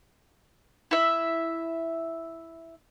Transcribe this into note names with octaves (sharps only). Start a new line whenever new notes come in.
E4 E5